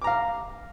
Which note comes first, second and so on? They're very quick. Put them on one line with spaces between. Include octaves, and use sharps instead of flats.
D6 A#5 F5